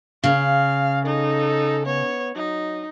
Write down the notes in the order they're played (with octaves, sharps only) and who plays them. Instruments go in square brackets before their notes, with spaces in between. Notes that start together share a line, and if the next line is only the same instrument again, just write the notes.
[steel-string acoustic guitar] C#3 [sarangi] F5
[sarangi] D#4 [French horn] A4
[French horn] B3 [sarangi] C#5
[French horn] F#3 [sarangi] D#4